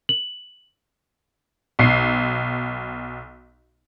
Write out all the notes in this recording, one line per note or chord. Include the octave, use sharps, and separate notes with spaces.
F#7
B1 C7